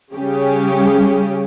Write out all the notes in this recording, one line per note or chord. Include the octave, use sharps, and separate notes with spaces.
C#3 G3 C#4 G4